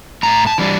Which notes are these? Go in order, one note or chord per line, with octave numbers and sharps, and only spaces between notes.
A2 A#5
A5
E3 G3 D4